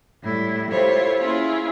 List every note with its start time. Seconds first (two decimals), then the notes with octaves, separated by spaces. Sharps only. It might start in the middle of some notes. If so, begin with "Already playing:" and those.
0.23 A2 G3 E4
0.71 E4 F4 G4 A4 C5 C#5
1.19 A#3 C#4 E4 F4 G#4